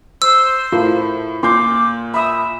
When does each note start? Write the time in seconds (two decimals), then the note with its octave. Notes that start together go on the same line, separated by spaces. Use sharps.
0.22 C5 E6
0.72 A2 F4 A4 A#4
1.43 A#2 C6 D6 G6
2.14 E5 B5 D#6